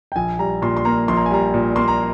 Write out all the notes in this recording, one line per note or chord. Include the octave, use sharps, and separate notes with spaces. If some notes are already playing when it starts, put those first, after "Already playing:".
G5
A#1 G#5
G3 A#5
A#2 C6
C6
A#3 A#5
A#1 C6
A#5
G#5
G3 A#5
A#2
A#3 C6
A#5